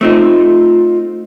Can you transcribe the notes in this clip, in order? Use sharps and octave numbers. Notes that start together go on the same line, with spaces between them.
A3 C4 D#4 F4